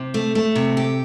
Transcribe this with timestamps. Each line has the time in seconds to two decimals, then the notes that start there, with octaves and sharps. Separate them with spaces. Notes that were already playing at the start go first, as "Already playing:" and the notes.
Already playing: C3
0.14 A3
0.35 A3
0.55 C3
0.77 G4